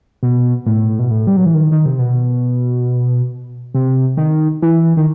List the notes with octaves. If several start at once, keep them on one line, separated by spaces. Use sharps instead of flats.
B2
A2
B2
A2
G3
F#3
E3
D#3
D#3
C3
B2
C3
D#3
E3
D#3